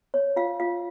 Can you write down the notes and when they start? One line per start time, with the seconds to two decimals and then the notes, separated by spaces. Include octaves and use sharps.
0.14 C#5
0.36 F4 F5
0.60 F4 F5